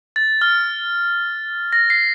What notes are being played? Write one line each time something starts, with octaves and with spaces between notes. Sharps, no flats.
A6
F6
A#6
C7